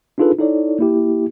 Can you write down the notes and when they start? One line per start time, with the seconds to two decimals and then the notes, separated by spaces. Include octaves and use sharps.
0.18 D4 D#4 F4 G#4 A4 B4
0.39 D#4 E4 A4 C#5 D5
0.79 A#3 E4 G4